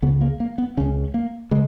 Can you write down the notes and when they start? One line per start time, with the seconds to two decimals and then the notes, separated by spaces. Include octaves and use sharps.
0.02 C#2 C#3 B3
0.21 A#3
0.40 A#3
0.58 B3
0.77 C#2 C#3 C#4
1.14 A#3
1.51 C#3 G#3